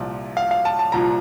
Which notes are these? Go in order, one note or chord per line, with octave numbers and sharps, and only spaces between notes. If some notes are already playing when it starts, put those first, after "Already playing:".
Already playing: C2 A#2 F3
F5
F5
A5
A5
C2 A#2 F3 A#5